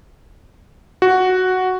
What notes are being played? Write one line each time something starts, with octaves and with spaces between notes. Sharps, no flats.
F#4